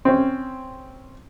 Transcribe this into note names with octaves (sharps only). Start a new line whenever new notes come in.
C4 C#4